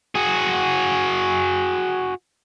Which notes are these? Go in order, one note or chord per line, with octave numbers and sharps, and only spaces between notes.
F#4 G#4